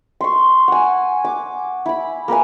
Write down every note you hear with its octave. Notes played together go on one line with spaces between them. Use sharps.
C6 C#6
F#5 G#5
D6
E4 B5
A#3 A#4 B4 G#5